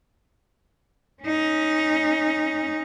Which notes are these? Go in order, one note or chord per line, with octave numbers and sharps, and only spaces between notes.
C#4 D#4